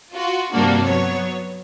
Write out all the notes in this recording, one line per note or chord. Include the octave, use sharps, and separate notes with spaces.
F4 F#4
G2 C3 G3 A#3 D4 F#4
F#3 B3 C#5